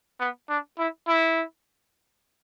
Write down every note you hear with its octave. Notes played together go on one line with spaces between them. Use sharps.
B3
D4
E4
E4